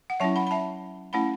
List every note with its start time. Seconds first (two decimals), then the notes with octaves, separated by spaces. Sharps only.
0.10 F#5
0.20 F#3 C#4 E4 E5 A5
0.36 F#5 B5
0.47 B5
0.51 E5 A5
1.13 A3 C#4 E4 F#5 B5